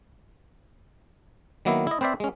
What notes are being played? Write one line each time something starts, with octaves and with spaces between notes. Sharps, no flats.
D#3 F#3 A#3 B3 E4
E4 D#5
C4 B4 C5 D5 E5
G#3 C#4